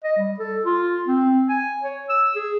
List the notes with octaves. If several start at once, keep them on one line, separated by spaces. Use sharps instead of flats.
D#5
G3
A4
F4
C4
G#5
C#5
E6
G#4